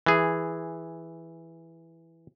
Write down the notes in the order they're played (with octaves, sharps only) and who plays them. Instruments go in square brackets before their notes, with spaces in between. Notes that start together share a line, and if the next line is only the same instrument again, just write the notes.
[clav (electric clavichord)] E3 G#4